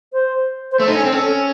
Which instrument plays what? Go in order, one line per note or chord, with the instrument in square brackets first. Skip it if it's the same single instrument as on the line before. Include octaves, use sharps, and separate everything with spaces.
[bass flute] C5
C5
[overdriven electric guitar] A3 [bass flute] A4
[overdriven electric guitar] D#4
[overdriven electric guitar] C#4 [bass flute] A4
[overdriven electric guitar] C4
[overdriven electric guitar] C#4 [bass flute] A4